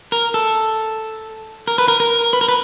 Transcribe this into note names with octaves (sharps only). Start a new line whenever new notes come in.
A#4
A4
A#4
B4
A#4
A#4
B4
A#4
B4